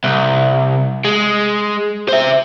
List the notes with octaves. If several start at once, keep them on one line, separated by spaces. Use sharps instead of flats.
C2
G#3
C5 E5